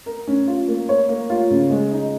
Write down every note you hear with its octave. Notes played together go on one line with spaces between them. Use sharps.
A#4
C#4
F4
A#3
C#5
A#3
F4
C#3
G#3
D#4